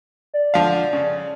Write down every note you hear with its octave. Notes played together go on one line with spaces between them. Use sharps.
D5
D3 F3 F5
C#3